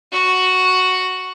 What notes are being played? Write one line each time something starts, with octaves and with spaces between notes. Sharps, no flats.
F#4